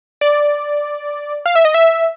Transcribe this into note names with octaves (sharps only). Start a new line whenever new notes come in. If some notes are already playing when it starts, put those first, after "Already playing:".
D5
F5
E5
D#5
E5